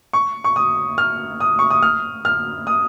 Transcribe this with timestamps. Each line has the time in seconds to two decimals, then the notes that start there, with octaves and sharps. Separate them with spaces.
0.13 C#6
0.44 C#6
0.56 D#6
0.98 F6
1.40 D#6
1.59 C#6
1.71 D#6
1.82 F6
2.25 F6
2.67 D#6